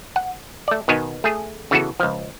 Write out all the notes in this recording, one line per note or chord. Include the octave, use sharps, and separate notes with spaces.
F#5
A3 D5
B2 D#3 B3 G#5
A3 G#4
C#3 E3 B3 F#4 A4
C#2 F3